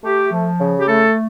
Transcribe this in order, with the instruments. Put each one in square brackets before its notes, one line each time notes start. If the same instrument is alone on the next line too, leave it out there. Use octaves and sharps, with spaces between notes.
[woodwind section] A3 G4
F3
C#3
G4
A3 A4